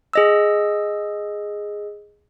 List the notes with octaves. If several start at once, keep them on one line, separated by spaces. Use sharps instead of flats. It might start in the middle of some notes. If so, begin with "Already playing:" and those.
G#4 D#5 E6